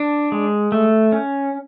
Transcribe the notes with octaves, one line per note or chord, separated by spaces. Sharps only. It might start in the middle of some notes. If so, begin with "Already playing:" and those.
Already playing: D4
G#3
A3
C#4